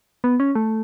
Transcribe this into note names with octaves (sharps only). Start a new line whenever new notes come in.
B3
C#4
A3